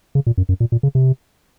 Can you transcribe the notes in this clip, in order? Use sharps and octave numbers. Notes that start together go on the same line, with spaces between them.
C#3
A#2
F#2
F#2
A#2
A#2
C#3
C3